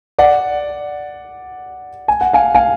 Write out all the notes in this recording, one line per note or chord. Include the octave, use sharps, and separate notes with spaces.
D5 F#5
G#5
F#5
F5 G#5
F5 G#5